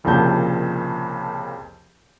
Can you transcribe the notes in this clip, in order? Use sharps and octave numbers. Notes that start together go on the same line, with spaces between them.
C2 F2 A#2 C#3 A5 G6